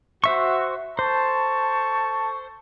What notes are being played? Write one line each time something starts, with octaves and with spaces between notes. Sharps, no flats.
F#4 C5 E5 C#6
A4 C5 A5 C#6